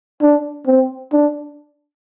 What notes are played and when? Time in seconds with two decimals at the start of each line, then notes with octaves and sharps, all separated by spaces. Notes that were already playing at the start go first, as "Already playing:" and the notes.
0.22 D4
0.67 C4
1.13 D4